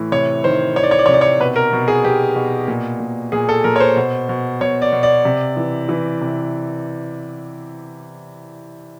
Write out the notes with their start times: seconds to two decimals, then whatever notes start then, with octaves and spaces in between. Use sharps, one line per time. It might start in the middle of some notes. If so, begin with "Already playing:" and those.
Already playing: A2 E3
0.12 C3 C#5
0.44 D#3 C5
0.76 D#3 C#5
0.83 D5
0.91 C#5
0.99 D5
1.06 C#5
1.08 C3
1.14 D5
1.21 C#5
1.40 B2 B4
1.56 A#4
1.73 B2
1.88 G#4
2.04 B2 G4
2.36 B2
2.68 A#2
3.00 A#2
3.32 A#2 G#4
3.49 A4
3.64 A#2 A#4
3.76 C#5
3.80 C5
3.96 B2
4.29 B2
4.61 B2 C#5
4.82 D5
4.92 B2
5.03 D5
5.25 C3
5.57 E3
5.89 E3
6.21 C3